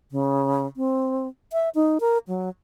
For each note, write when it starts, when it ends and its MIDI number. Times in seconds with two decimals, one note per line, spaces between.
0.11 0.66 49
0.77 1.27 60
1.53 1.69 76
1.75 1.98 63
2.00 2.18 70
2.28 2.49 54